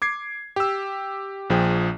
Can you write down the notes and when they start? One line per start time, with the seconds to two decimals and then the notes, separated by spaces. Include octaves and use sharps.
0.02 D6 G#6 C7
0.56 G4 E6
1.50 A#1 F3 G#4 G5